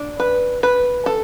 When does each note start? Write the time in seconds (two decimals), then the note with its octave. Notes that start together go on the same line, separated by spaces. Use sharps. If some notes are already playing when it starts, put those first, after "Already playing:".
Already playing: D4
0.20 B4
0.63 B4
1.06 A4